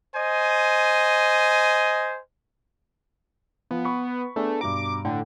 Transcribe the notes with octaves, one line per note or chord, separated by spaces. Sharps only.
C5 D#5 G#5
F3 B3
B5 C#6
A3 B3 D4 G#4
G2 B2 A#5 D6
A2 D3 G5